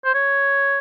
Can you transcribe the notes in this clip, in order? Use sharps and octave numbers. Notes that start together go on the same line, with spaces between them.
C5
C#5